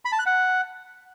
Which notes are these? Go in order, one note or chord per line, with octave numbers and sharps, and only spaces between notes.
B5
A5
F#6
F#5